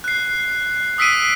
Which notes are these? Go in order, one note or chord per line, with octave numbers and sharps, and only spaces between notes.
F#6 C7
D#6 E6 B6 C7 D7 D#7